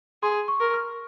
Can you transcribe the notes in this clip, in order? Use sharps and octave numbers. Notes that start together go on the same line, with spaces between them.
G#4 C6
C#6
A#4
F6